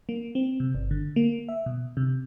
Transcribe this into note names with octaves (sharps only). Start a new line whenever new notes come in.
A#3
C4
C3
G1
D3
A#3
E5
B2
C3